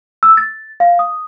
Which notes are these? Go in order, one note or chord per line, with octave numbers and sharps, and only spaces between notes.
E6
A6
F5
D#6